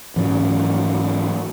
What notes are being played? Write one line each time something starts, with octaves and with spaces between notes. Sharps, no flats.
G#2 E3 F#3 C#4